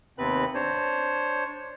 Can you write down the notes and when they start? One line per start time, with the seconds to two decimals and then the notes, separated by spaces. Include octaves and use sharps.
0.18 D#2 C3 B3 C4 B4 F#6
0.54 D4 C5 C#5